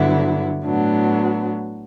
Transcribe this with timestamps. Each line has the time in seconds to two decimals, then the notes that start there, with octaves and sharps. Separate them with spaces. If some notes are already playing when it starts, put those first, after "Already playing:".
Already playing: G2 D3 F#3 B3 E4
0.64 A2 F#3 B3 D4